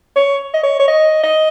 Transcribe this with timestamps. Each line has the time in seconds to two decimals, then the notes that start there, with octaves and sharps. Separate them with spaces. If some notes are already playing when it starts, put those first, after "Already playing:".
0.16 C#5
0.54 D#5
0.63 C#5
0.80 C#5
0.88 D#5
1.23 D#5